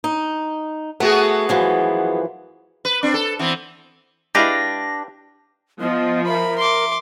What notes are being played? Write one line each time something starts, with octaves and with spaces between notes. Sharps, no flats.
D#4
A3 B3 F#4 G#4
F#2 E3 F3
B4
C4 D4
A4
E3 B3 C4
G#3 D4 E4 G4 B4 F5 A#6
F3 B3 D#5
A#4 E5 B5
C6 D6